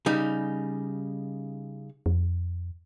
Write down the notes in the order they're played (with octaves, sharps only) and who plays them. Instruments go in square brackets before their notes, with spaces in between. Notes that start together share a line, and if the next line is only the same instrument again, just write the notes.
[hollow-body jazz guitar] C#3 G3 D#4
[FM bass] F2